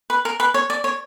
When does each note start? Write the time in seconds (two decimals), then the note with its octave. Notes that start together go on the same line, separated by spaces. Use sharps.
0.10 B4
0.25 A#4
0.40 B4
0.54 C#5
0.70 D5
0.84 C#5